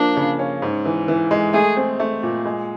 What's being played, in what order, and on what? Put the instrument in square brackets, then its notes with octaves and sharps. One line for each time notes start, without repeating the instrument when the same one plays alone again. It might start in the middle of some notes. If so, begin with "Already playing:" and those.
Already playing: [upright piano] F3 A#3 [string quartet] D4
[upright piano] C#3
C#4
G#2
E3
E3
G#3
[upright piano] A3 [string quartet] G#4
[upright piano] C4
A3
A#2
G#3